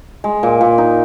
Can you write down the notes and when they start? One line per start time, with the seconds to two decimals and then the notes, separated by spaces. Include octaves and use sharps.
0.24 G#3
0.43 A#2
0.61 A#2
0.78 D#4